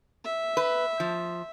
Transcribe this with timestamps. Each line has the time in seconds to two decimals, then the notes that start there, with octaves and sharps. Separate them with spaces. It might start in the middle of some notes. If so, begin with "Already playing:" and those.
0.24 E5
0.57 B4
1.00 F3